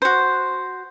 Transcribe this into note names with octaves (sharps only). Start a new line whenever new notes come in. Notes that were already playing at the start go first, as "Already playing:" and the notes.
F#4 C5